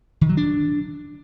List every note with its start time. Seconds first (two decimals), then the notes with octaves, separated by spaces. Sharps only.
0.21 D#3
0.29 F#3
0.37 D4